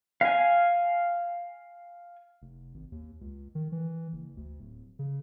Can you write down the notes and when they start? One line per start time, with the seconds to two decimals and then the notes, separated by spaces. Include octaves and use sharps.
0.21 F5 G#5
2.42 F1
2.74 G#1
2.92 D#2
3.21 C#2
3.55 D#3
3.72 E3
4.12 F#1
4.37 D2
4.60 D1
4.99 C#3